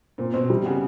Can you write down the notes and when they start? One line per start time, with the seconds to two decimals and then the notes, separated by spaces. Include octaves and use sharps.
0.18 A#2 C4
0.34 B2 C4
0.50 C3 G3
0.66 C#3 B3